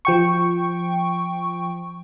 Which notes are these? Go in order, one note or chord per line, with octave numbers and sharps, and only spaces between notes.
F3 G5 C#6